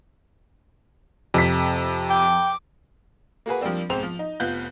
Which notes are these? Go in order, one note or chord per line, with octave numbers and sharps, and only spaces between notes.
F2 C3 B6
G5 D6
A#3 F#4 G#4 B4
F3 G3 A#3 C4 D4
B1 G#2 C4 C5 F7
F3
D#4
F1 B3 F4 F#6 G6